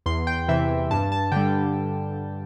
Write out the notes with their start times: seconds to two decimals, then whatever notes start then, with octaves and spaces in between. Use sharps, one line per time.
0.06 E2 C6
0.27 G5
0.48 C3 E3 E5
0.91 G2 A5
1.12 A5
1.32 D3 G3 G5